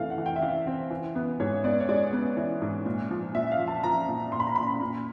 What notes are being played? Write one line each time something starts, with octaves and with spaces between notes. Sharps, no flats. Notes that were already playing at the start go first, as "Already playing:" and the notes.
Already playing: C3 E3 A3 F5
F#5
E3
G5
E5
E3 F5
C4
E3
B3
G#2 C#5
B3 D5
C#5
G#3 D5
B3
E3
G#2
A#2
F3
A#2 E5
F5
F3
A5
F3 A#5
A#2
A#2 C6
B5
A#5
A#2 B5
A#2